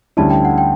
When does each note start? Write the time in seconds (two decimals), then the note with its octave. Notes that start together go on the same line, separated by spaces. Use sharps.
0.17 D2 D3 G3 C#4 E4 A5
0.31 G5
0.45 F#5
0.58 G5